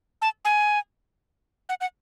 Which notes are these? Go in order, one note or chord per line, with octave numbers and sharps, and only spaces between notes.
A5
G#5
F#5
F#5